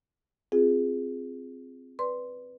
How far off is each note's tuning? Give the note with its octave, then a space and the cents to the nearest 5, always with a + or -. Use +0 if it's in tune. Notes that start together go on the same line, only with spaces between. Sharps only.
C4 +0 F4 +0 G#4 +0
B4 +0 D5 +0 C6 +0